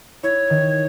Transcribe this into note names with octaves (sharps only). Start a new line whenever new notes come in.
E4 C#5
D#3